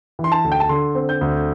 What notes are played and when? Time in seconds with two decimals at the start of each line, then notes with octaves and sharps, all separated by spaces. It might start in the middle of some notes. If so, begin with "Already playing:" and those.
0.19 E3
0.24 C6
0.32 A5
0.44 D2
0.52 G5
0.60 A5
0.69 D3 C6
0.95 C4
1.09 G6
1.21 D2